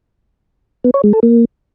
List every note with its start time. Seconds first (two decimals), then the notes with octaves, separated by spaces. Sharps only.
0.84 B3
0.94 C#5
1.04 G#3
1.13 A4
1.23 A#3